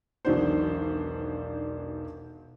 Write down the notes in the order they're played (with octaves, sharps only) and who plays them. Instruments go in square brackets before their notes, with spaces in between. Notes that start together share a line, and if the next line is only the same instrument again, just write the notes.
[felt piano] E1 B1 D#3 D4 F#4 C5